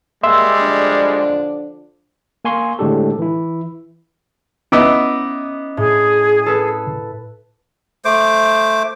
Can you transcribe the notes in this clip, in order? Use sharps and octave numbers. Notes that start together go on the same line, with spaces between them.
G3 G#3 A#3 E5 C6 E6
D3 F3 D4
A#3 G#5 C6 C#6
A2 D3 G#3 D4 G4 A4
E3 E4
B3 C#4 D#4 E4 D6 E6 D7
A2 G#4
A4 B4
A3 C5 D6